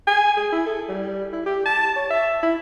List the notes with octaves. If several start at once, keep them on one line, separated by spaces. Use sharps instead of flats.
G#5
G#4
E4
A4
G3
E4
G4
A5
C#5
E5
E4